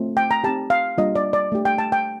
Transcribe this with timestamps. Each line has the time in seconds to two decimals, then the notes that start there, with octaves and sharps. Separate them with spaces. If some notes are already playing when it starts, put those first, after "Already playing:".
Already playing: A3 C4 F4
0.17 G5
0.31 A#5
0.44 C4 D#4 G4 A5
0.70 F5
0.98 G3 A#3 D4 F4 D#5
1.16 D5
1.33 D5
1.52 A3 D4 G4
1.65 G5
1.78 A5
1.92 G5